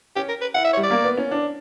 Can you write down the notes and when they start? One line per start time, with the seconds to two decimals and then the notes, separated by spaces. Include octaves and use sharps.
0.16 C#4 G4
0.29 A#4
0.42 B4
0.55 E4 F#5
0.65 E5
0.73 C#5
0.77 G3
0.83 D5
0.91 A#3
1.04 B3
1.17 C#4
1.31 D4